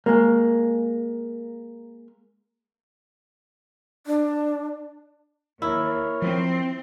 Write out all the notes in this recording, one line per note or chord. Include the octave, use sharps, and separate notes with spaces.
G#3 A#3
D4
D#2 E4 A#4 C#5
F3 C4